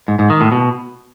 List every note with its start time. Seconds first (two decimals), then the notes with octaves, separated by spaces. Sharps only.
0.08 G#2
0.19 G#2
0.30 D#3
0.41 A2
0.52 B2